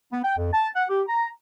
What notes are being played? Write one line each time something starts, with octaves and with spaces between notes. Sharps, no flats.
B3
G5
F2
A5
F#5
G4
A#5